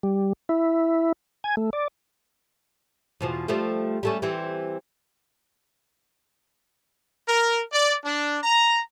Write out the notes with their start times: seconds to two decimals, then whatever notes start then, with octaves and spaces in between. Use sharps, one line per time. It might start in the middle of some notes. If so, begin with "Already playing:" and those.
0.03 G3
0.49 E4
1.44 G#5
1.57 A3
1.73 D5
3.21 E2 B2 F3
3.48 F3 G3 A3
4.03 G3 A3 C#4
4.22 E3 G3 C4
7.27 A#4
7.72 D5
8.05 D4
8.43 A#5